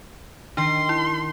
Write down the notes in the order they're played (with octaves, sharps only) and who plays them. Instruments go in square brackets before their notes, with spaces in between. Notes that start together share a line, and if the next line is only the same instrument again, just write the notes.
[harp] D#3 [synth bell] D4 G5 [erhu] C6
[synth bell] E4